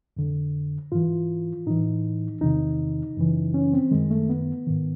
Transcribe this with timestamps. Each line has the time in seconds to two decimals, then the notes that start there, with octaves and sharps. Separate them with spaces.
0.17 F2 D3
0.92 G#2 E3 F4
1.66 A2 E3 D#4
2.41 E2 C3 D#3 D#4
3.17 F#2 C#3 E3
3.54 C#4
3.73 C4
3.91 F#2 D#3 G#3
4.10 A3
4.29 B3
4.67 G#2 D#3